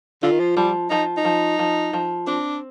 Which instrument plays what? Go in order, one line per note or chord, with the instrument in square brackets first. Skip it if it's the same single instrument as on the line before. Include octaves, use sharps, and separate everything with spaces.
[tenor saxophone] D3 [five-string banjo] F4
[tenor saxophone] D#3
F3
[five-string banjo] F3 [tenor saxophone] G3
[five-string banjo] F3 [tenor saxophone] D#4
[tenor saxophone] D#4
[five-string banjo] F3
F3
F3
[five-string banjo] C4 [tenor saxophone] D4